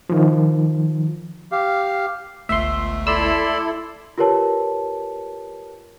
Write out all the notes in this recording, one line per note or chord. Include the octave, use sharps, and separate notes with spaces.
D#3 F3
G4 F5
G1 C#2 A3 E5 C6
E4 A4 D5 B5 C6 E6
F4 G4 A#4 B4 C#5 A5